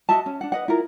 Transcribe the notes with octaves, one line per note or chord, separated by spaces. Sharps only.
F#4 D#5 E5 A5
C#4
D4 F#5
B4 D#5 F#5
E4 F4 A#4